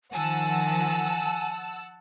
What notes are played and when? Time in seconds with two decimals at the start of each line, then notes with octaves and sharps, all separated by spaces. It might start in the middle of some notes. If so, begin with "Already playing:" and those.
0.13 D#3 F3 F#5 G#5 A5 E6